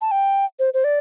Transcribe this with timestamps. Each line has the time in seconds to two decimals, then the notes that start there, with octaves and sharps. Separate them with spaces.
0.01 A5
0.11 G5
0.59 C5
0.74 C5
0.84 D5